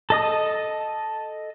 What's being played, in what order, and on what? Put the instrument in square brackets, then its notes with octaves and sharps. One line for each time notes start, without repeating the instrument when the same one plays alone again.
[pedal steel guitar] A4 D#5 D#6